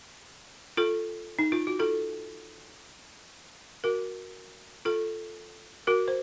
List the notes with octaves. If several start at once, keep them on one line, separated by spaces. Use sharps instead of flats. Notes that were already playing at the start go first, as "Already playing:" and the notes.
F4 A4
D#4
F4
F#4
F4 A4
F#4 A#4
F4 A4
F#4 A#4
C5